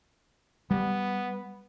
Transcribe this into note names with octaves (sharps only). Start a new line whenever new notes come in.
G3 B3